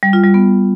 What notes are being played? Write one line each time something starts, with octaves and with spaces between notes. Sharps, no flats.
G3
F4
G3
B3